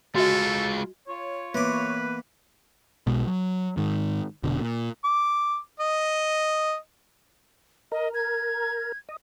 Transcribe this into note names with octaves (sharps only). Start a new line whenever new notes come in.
G#3 F4 F#4 A4 D#5
F4 C#5
E3 A#3 B3 B4 D6
B1 B2 G#3
F#3
G#2 D#3
F1 B2 D3
A#2
D6
D#5
A#4 D#5
G#6
D#5